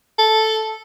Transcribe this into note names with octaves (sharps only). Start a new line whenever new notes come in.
A4